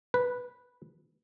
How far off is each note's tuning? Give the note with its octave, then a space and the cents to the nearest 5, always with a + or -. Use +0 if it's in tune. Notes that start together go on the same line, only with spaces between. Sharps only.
B4 -5